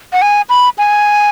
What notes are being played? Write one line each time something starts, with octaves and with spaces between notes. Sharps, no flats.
F#5
G#5
B5
G#5